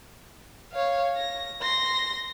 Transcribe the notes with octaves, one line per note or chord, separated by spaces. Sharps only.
C#5 F5
A#6
C6 A#6